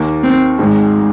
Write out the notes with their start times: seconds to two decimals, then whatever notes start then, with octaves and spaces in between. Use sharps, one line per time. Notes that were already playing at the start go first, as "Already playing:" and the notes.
Already playing: D#2 D#3 A#3
0.23 C4
0.59 G#1 G#2 D#3 G#3